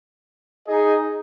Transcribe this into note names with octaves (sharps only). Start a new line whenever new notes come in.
D#4 G#4 D#5